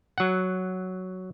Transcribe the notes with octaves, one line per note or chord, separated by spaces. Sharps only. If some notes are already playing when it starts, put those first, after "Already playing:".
F#3 F#5